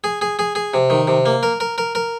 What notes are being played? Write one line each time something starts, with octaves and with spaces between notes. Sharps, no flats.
G#4
G#4
G#4
G#4
C3
D#3
C3
A#3
A#4
A#4
A#4
A#4